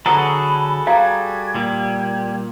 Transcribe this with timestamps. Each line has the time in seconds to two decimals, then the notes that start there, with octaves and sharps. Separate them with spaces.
0.06 D3 F#3 F#4 G#4 A4 A#5 B5
0.87 G3 F5 A#5 G#6
1.55 A#2 G3